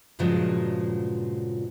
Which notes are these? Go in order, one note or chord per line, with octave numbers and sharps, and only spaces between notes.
G2 A#2 C#3 F3 F#3 G#3